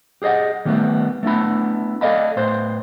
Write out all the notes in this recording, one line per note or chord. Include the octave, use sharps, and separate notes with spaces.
G4 G#4 C#5 D#5 F#5
D#3 G3 A3 B3
A3 B3 D4 E4 B5
A4 C5 D5 D#5 F5 B5
A2 B4 C5 C6